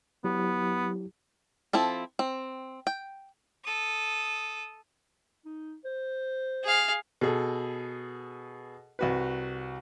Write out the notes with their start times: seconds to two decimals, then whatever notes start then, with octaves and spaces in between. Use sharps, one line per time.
0.24 F#3 B3 E4 G4
1.73 F3 C4 E4 A4
2.19 C4
2.87 G5
3.64 A4 D#6
5.46 D#4
5.85 C5
6.63 G#4 F5
7.21 B2 G#4 A4
8.99 C2 F#4 B4